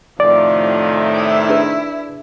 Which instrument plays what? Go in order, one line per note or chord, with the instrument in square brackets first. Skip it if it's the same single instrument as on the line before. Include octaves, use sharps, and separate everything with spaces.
[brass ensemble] A2 C3 D#3 [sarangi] F3 [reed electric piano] D5
[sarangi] E4 [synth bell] D6 D#6
[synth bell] D4 G#4 B4